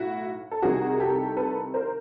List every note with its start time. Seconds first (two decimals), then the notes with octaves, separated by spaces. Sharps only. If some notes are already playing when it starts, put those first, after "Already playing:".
Already playing: B1 A2 E4 F#4
0.51 A4
0.62 C2 C3 D#3 F#4 G#4
1.00 G4 A4
1.37 A4 B4
1.74 A#4 C5